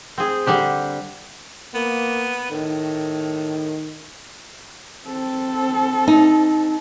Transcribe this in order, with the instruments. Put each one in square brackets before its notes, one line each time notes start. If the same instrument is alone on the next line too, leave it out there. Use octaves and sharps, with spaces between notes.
[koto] C4 G#4
D3 G3 D4 G4
[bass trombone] A#3 [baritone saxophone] B3
[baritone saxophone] A2 [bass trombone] D#3
[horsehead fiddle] C4 A4
[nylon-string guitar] D#4